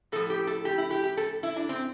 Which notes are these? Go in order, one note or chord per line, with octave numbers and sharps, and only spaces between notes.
A2 F3 A4
G4
A4
G4
E4
G4
G4
A4
E4
D4
C4